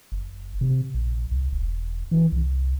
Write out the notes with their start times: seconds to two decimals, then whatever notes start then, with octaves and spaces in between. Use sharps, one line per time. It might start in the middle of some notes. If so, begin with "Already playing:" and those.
0.12 F#1
0.61 C3
0.94 A#1
1.31 C2
1.52 E1
2.11 E3
2.32 C2